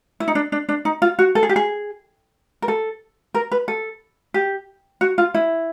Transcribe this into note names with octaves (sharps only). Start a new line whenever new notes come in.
E4
D#4
D4
D4
D4
D#4
F4
F#4
A4
G#4
G4
G#4
A#4
A4
A#4
B4
A4
G4
F#4
F4
E4